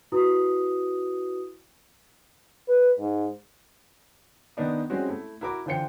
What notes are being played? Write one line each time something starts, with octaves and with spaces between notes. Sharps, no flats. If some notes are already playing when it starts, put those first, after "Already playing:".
E4 F#4 B4 D#6
B4
G#2
D#3 B3 D4 D#4
G3 G#3 C4 C#4 F#4
A3 E4
E4 F#4 A#4 B5 D6
D3 E3 F4 C5 G5 C#7